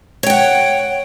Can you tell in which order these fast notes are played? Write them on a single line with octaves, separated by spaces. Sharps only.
C#5 G5 F#5